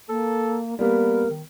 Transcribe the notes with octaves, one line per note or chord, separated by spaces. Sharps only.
A#3 A4
G3 A#3 B3 A#4
D#3